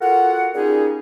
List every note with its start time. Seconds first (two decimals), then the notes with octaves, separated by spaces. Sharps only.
0.01 F4 F#4 A4 A#4 F#5
0.54 G3 A#3 C#4 D#4 F4 G#4